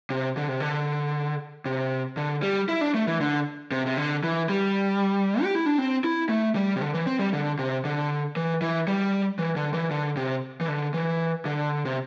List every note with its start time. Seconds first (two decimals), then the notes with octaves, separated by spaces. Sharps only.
0.10 C3
0.37 D3
0.48 C3
0.60 D3
1.66 C3
2.17 D3
2.43 G3
2.69 E4
2.81 D4
2.95 A3
3.07 E3
3.20 D3
3.71 C3
3.86 C3
3.97 D3
4.24 E3
4.49 G3
5.43 G4
5.55 E4
5.66 D4
5.78 C4
6.04 E4
6.29 A3
6.55 G3
6.76 C3
6.81 D3
6.94 E3
7.07 C4
7.20 G3
7.33 D3
7.59 C3
7.85 D3
8.36 E3
8.62 E3
8.88 G3
9.39 E3
9.56 D3
9.74 E3
9.91 D3
10.17 C3
10.61 E3
10.68 D3
10.94 E3
11.45 D3
11.85 C3